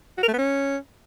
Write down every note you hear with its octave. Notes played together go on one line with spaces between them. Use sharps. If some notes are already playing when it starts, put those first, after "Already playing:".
F#4
A#4
A3
B3
C#4